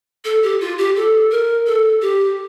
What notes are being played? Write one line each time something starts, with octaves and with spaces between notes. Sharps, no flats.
A4
G4
F4
G4
A4
A#4
A4
G4